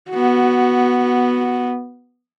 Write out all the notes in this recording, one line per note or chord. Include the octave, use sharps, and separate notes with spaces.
B3 F#4